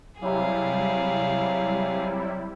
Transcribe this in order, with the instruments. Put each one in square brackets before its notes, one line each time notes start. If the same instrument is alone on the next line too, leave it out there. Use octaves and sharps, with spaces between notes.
[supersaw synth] C3 G3 E4 [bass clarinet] F#3 [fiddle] G#4 F5